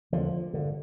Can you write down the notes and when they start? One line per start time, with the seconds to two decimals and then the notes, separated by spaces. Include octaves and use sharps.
0.12 E2 D3 F3
0.53 G2 D3